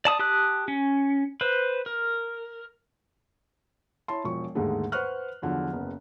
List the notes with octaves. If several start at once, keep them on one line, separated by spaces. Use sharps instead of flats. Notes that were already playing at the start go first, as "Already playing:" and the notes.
D5 A5 D#6
G4 A5 D#6 F#6
C#4
B4 C5
A#4
E4 C#5 A5 C6
E1 F3 C#6
D#2 G#2 D3 D#3 G#3 A3
B4 C5 F#5 C#6 F6 F#6
E2 D3 F3 F#3
F#1 B3